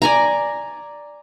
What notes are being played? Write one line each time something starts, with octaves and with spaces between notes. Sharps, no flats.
D5 G#5 A#5